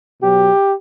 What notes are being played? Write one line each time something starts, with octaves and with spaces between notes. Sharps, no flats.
B2 F#3 G4